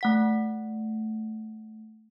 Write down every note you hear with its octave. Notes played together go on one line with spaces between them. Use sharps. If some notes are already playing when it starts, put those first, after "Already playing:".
A3 F#5 B6